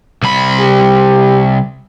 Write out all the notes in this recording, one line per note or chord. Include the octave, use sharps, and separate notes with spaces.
C2 B5
G4